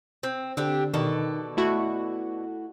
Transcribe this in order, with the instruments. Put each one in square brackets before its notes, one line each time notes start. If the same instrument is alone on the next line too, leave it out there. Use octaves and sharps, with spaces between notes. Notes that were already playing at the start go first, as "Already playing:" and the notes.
[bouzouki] C4
[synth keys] D3 [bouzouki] C4 D4 G4
[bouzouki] B2 A4 D5 [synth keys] D#3
[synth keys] A3 E4 F#4